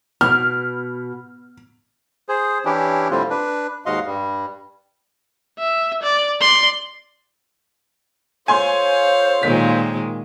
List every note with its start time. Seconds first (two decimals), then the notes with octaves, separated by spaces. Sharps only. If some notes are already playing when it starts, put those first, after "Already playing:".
0.21 B2 F6
2.29 G#4 C5
2.65 E3 C#4 D4 E4 G4
3.11 A2 D3 G3 C4 F4
3.30 D4 B4
3.86 D#2 G#2 F#4 D#5 F5 C6
4.06 G2 G3
5.59 E5
6.03 D5
6.41 D5 C6
8.48 F4 A4 C5 C#5 F5 G#5 C6
9.43 A#2 D#3 G#3 B6